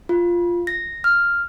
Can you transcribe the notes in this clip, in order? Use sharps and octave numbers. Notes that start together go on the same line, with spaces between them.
F4
A#6
F6